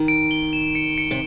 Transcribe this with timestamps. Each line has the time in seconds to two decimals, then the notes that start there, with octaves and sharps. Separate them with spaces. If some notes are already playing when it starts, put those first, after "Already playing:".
Already playing: D#3
0.08 D7
0.31 G7
0.53 E7
0.75 C#7
0.98 C#7
1.11 C3